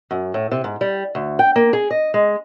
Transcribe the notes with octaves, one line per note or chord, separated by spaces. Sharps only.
F#2
A2
C3
G#2
G3
D2
G5
A#3
G#4
D#5
G#3